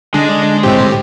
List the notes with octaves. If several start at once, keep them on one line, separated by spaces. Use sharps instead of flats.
D3 G#3 D4 D#5
A2 C4 G4